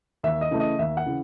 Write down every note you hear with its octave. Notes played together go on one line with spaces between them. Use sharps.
D#2 E5
D#5
C#3 E3 A3
D#5
D#2 E5
F#5
C#3 E3